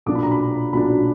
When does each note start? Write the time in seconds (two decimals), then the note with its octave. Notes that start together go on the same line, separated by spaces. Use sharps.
0.06 B1 A#2 F#3 D4 D6
0.15 B5
0.23 A#5
0.31 B5
0.73 B1 A#2 F#3 D4 B5